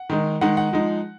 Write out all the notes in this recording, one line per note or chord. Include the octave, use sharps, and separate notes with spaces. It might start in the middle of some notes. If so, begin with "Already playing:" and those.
Already playing: F#5
D#3 G#3 D#4
D#3 G#3 D#4 F#5
F#5
F3 G#3 D#4